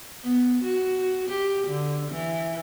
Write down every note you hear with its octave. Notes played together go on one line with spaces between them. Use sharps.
B3
F#4
G4
D3
E3